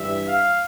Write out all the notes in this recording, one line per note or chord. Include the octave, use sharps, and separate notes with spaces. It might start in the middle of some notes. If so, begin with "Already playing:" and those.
Already playing: G2 E3 G3 E5
F5